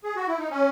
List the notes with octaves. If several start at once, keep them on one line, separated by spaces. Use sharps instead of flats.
G#4
F#4
E4
D#4
C#4